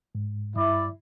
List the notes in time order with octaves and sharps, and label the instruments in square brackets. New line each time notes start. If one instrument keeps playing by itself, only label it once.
[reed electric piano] G#2
[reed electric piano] G2 [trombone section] E4 [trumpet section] D5